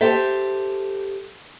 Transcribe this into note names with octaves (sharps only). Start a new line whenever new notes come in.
G4 A4 C5 E5 G5